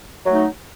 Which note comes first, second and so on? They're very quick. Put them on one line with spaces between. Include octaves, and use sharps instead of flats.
F#3 A3 D#4